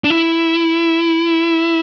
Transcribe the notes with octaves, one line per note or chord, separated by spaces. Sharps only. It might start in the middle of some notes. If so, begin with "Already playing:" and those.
D4
E4